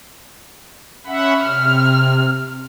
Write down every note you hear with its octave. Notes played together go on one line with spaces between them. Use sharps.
C#4 E5 F#5 B5
C3 F6